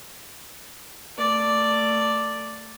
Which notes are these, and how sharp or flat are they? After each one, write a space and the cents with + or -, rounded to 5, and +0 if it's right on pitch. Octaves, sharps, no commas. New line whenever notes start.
A3 +25 D5 +0